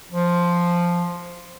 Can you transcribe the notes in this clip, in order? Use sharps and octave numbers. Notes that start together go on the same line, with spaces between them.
F3